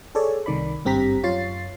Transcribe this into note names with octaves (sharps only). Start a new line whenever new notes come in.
G#4 A4 C#5 D5
C2 D#3 D5 B5
G#1 G2 C4 G4 A#5 B6
F#2 F4 C#5 A6 C7